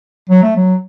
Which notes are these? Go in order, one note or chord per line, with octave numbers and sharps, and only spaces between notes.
F#3
A3
F#3